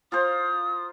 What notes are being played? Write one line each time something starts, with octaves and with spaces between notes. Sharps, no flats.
F4 A#4 C5 D#6